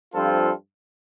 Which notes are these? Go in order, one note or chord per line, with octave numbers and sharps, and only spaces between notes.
G2 F3 C4 F4 A4